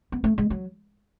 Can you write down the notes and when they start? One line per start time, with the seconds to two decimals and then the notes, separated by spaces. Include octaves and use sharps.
0.12 B3
0.24 A3
0.38 G#3
0.50 F#3